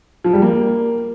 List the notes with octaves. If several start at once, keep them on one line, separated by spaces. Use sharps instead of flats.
F3
G3
A#3